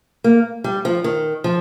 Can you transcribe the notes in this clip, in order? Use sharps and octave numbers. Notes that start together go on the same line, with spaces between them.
A#3
G3
F3
D#3
F3